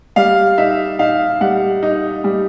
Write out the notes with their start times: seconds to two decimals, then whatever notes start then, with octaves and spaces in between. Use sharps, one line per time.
0.16 G3 F5
0.58 D#4 E5
0.99 D#4 F5
1.41 G3 F#5
1.83 D#4
2.24 G3